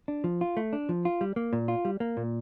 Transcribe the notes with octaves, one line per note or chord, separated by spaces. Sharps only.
D4
F3
F4
A3
D4
F3
F4
G3
A#3
A#2
F4
G3
A#3
A#2